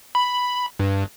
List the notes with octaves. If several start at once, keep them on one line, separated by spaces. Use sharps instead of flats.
B5
G2